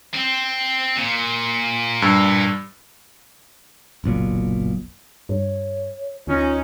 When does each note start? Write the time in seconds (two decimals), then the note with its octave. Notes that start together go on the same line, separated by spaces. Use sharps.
0.14 C4
0.97 A#2
2.02 G2
4.04 F#1 B1 A#2
5.29 G2 C#5
6.27 D2 C#4 D#4 F4